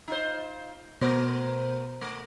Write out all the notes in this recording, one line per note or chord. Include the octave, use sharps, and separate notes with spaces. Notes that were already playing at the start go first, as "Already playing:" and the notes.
D#4 F4 C5
B2 A3 B3 A#4 C5
A3